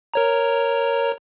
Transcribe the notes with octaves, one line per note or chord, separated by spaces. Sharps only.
A#4 C#5 A#5